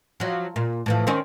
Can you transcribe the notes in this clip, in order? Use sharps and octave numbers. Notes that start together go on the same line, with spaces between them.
F3 F#3
A#2
A2 E3 F3
D#3 C4 C#4